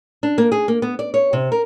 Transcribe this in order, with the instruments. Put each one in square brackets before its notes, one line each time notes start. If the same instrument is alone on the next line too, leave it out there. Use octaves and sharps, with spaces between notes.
[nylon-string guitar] D4
A#3
G#4
A#3
B3
D5
C#5
C3
A#4